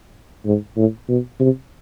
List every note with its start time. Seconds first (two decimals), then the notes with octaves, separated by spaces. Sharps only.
0.46 G#2
0.77 A2
1.08 B2
1.40 C3